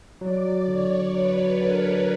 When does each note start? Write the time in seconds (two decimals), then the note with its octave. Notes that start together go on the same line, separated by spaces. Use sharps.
0.21 F#3 D5
0.68 D3 C#5
1.13 F#3 B4
1.60 D3 A#4